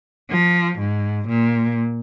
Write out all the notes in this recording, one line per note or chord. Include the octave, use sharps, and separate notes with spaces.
F3
G#2
A#2